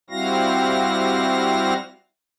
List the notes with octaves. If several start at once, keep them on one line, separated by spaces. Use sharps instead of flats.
G3 C4 E4 F#4 F5 A#6